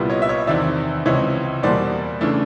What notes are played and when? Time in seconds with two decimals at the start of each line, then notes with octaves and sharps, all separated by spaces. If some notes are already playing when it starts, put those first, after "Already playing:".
Already playing: C2 A#2 G3 B3 E4
0.10 C#5 D#5
0.22 E5
0.29 C#5 D#5
0.47 E2 C3 D#3 D5 E5
1.06 C#2 C3 E3 C#5 D#5
1.63 E2 B2 G3 A#3 C5 D5
2.21 C#3 E3 A3 D4